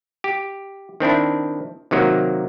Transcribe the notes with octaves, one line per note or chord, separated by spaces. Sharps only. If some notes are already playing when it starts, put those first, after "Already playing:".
G4
D#3 C4 D4 E4
C3 D#3 F#3 A#3